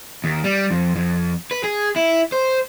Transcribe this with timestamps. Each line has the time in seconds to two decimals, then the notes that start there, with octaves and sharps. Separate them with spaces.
0.24 D#2
0.44 G3
0.71 F2
0.96 F2
1.51 B4
1.64 G#4
1.96 E4
2.32 C5